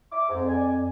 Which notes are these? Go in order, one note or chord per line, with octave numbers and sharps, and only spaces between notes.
E5 D6
F2 G#2
D5 G#5